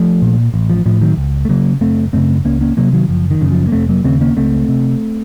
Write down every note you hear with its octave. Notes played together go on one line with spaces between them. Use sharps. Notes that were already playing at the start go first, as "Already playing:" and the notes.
Already playing: F3 A3
A#2
A1
F3
A2 F3
D#3 F#3
C#2
A3
C#3 F#3 A#3
F#1 A3 C4
F#2 C#3 A3 C4
C#2 A#3 C#4
A#3 C#4
C3 F#3 A#3
D#3 F#3
F#1 F3
D#3
F#2 C#3
F3
A#3
F1 A3 C4
F#3 A#3
D#2 C#3 A3 C4
A#3 C#4
C#2 A3 C4
C3